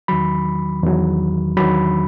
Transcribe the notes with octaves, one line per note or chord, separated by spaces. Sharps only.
E2 D#3 F#3 B5
E2 D#3 F#3
E2 D#3 F#3 B5